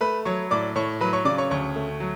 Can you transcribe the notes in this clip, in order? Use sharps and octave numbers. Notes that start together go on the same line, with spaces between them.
A3 B4 B5
F#3 C#5 C#6
A2 D5 D6
A2 C#5 C#6
F#3 B4 B5
C#5 C#6
C#3 D5 D6
C#5 C#6
D2 C#5 C#6
A3
F#3